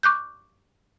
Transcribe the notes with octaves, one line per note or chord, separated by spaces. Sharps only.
C#6 D6 F#6 G6